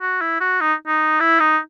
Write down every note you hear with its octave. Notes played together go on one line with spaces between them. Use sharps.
F#4
E4
F#4
D#4
D#4
E4
D#4